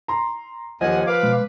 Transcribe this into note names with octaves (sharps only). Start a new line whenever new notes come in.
A#5 C6
D#2 F3 A#4 D#5 F#5 G#5
B4 F5 D6
B2 G#3